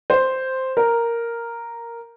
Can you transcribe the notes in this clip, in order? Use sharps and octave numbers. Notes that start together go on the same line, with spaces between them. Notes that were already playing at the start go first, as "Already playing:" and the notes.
C5
A#4